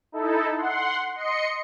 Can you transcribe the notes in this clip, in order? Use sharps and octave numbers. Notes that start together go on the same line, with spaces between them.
D#4 E4 A4
F#5 C6
D#5 C6 C#7